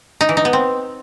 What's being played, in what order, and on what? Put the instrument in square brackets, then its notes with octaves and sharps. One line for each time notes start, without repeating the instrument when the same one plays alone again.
[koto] D#4
E3
D#4
B3
C4